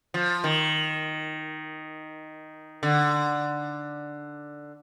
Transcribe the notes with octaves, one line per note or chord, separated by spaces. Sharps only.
F3
D#3
D3